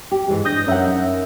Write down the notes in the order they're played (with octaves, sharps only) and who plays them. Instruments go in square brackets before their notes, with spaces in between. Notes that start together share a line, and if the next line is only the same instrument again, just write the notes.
[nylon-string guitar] G4
G#2 E3 G#3
[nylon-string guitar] D4 [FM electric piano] D#6 G6 A#6
[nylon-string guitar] F#2 D#4 F#5 [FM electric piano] C#4 A#4 E5